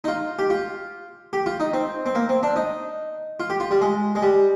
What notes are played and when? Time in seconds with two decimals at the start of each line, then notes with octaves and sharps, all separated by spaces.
0.04 D#4
0.08 F4
0.39 G4
0.50 F4
1.33 G4
1.46 F4
1.60 D#4
1.73 C4
2.06 C4
2.15 A#3
2.29 C4
2.43 D4
2.56 D#4
3.40 F4
3.50 G4
3.60 F4
3.71 G3
3.81 G#3
4.15 G#3
4.22 G3